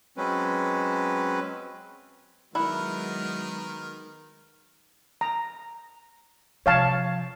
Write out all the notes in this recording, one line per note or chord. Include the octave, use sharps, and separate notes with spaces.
F#3 G#3 C4 C#4 B4
D#3 F#3 G#3 B3 E4 A#4 F#5
A#5
C3 F3 C#5 F5 A5